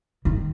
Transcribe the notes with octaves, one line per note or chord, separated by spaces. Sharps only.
D#3